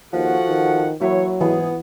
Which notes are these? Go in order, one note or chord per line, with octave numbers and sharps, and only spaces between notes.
D#2 F3 F#4 A4 F#5
D#3
E3 F#3 A#3 E4 F#4 C#5
G#2 E3 B3 G#4